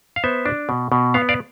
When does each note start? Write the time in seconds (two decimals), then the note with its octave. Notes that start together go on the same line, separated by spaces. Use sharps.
0.16 F5
0.24 B3 C5 E5
0.46 D4
0.69 B2
0.92 B2
1.14 B3 F5
1.29 D5 F5